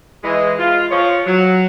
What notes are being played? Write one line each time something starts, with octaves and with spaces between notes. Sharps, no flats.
E3 G#3
F4
F3 C#5
F#3